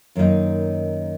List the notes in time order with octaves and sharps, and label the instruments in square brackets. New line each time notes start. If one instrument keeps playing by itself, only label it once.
[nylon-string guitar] F#2 D#3 A#3 D#4